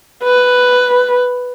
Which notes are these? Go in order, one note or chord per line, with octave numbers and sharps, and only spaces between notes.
B4